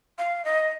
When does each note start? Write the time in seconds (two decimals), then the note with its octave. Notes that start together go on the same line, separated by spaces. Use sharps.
0.18 F5
0.45 D#5